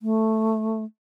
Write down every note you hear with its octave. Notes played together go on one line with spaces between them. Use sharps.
A3